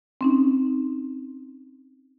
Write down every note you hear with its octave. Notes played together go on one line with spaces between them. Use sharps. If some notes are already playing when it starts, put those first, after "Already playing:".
C4 C#4 D#4